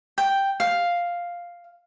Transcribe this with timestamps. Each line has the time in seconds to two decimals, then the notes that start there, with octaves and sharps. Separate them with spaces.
0.18 G5
0.60 F5